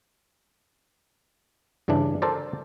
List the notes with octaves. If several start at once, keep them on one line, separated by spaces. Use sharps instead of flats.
G2 C#3 E3 D4
A4 A#4 C5 D5